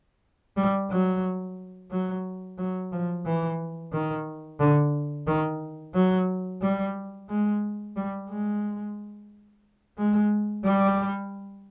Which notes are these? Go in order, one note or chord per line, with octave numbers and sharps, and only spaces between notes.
G3
F#3
F#3
F#3
F3
E3
D#3
D3
D#3
F#3
G3
G#3
G3
G#3
G#3
G3